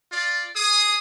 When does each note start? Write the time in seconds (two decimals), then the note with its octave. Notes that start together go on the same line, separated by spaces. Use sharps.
0.12 F4 D5
0.56 G#4 D#6